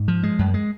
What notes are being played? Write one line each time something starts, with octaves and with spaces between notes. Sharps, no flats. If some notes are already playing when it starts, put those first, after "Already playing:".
Already playing: G#2
F3
G#3
F#2
G#3